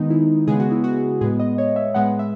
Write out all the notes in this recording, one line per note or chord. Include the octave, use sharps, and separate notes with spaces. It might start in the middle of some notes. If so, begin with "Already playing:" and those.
Already playing: D#3 G#3 B3 D#4
E4
C#3 G#3 B3 G#4
F#4
E4
F#4
A2 G#3 B3 G#4
D#5
C#5
E5
A2 G#3 B3 F#5
E5